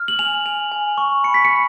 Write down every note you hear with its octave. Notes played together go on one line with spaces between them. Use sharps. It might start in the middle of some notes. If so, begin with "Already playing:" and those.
Already playing: F6
F#7
G#5 F7
G#5 F7
G#5
C#6
B5 C#7
B6
C#7
B5